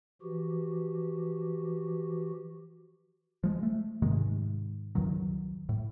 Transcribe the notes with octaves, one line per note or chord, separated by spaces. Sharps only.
E3 F3 F#4 G4
F3 G#3
A3
G#2 C3 D#3 G#3
C#2 G2 D#3 F#3
A2